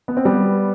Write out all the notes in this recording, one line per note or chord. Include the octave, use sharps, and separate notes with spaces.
B3
C4
G3 B3